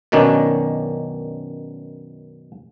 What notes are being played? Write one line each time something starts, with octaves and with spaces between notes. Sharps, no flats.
F#2 B2 D#3 C#4 D4